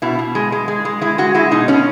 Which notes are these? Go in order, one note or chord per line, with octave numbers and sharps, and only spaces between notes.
B2 E4
B2
G#3
G#3
G#3
G#3
G#3 E4
G#3 F#4
G#3 E4
B2 D#4
B2 C#4